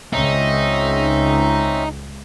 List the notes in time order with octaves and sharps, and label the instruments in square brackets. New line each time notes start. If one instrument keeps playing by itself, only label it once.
[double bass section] C#2 [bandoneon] C4 C#4 E5 [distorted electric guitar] D#4